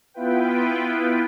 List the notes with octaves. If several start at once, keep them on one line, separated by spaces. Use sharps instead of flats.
B3 E4 F4 B4 G5